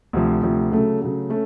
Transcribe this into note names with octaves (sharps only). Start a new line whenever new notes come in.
D2 C3 F3
D2 C3 F3
C#3 F#3 A3
C#3 F#3 A3
A3 C#4